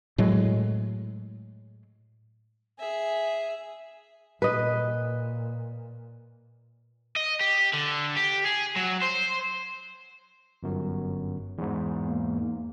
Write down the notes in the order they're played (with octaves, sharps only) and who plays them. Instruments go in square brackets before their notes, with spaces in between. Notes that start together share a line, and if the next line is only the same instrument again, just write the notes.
[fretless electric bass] A2 F#3 G#3 A3
[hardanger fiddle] G#4 E5
[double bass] A#2 [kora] B4 D#5
[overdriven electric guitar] D#5
G4
D3
G4
G#4
F#3
C5
[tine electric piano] G1 F#2
E2 G#2
[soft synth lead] A#3